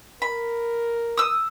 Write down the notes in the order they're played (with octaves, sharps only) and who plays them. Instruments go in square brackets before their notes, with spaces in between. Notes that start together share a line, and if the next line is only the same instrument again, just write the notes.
[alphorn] A#4 [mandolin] B5
[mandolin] D#6 E6